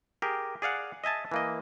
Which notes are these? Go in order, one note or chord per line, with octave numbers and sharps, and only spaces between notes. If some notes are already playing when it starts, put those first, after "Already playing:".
G4 G#4 A#4
G#4 D5 F5 F#5
D#5 E5 G#5 A5
E3 A#3 D#5